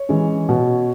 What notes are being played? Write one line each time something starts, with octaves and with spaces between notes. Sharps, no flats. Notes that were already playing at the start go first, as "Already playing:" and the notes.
Already playing: C#5
E3 G#3 C#4
B2